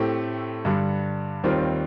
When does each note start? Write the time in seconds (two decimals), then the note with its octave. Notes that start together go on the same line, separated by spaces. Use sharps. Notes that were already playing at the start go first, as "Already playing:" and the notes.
Already playing: A2 A3 C4 G4
0.65 G2 D3 G3
1.44 D#2 D#3 G3 C4 F4